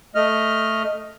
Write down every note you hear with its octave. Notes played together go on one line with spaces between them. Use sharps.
A3 D#5 F6